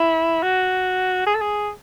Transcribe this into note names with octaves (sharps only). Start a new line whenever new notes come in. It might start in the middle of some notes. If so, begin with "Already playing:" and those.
Already playing: E4
F#4
G#4
A4
G#4